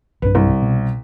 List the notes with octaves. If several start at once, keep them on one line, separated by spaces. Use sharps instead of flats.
B1 G2 D4 B4
C2
B2